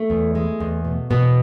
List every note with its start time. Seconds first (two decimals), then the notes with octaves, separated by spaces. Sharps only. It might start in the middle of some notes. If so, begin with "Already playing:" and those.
Already playing: A3
0.10 E2
0.35 G#3
0.60 E2
0.85 B2
1.10 E2 B2 B3